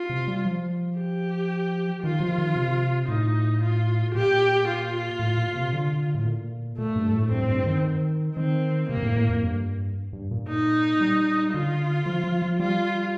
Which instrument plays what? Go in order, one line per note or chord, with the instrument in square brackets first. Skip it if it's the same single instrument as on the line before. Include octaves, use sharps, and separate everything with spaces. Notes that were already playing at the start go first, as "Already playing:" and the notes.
Already playing: [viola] F4
[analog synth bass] C3
G3
F3
[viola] G4
[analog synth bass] D#3 [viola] F4
[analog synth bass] F3
D#3
C3
[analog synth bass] A2 [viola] D#4
[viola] F4
[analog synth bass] A#2 [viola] G4
[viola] F4
[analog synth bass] A2
A#2
C3
D3
A2
A#2
[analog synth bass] A#2 [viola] A3
[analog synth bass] G2
A2
[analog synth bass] G2 [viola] C4
[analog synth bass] A2
G2
D#3
[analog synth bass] D#3 [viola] C4
[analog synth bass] C3 [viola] A#3
[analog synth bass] G2
A2
A2
F2
G2
G2
A#2
[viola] D#4
[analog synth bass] G3
[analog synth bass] D3 [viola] F4
[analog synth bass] F3
F3
F3
[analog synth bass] G3 [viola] F4